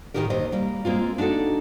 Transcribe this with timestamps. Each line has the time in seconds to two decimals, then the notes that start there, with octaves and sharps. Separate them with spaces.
0.14 A2 D#3 F3 D#4 G4 A#4
0.30 D#2 C3 C5 D#5
0.52 G3 A#3
0.85 G#3 A#3 C4 F4
1.18 D4 D#4 F#4 A4